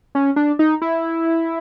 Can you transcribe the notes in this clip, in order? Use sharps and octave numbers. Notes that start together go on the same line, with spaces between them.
C#4
D4
D#4
E4